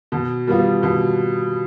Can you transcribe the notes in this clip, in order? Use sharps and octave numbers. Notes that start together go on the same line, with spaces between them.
B2
G3 B3 F4
B2